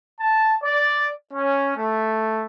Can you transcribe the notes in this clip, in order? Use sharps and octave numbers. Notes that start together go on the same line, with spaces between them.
A5
D5
C#4
A3